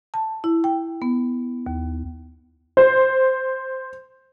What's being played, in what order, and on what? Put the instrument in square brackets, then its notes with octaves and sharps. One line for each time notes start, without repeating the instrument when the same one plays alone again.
[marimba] A5
E4
G5
B3
D#2
[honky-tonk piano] C5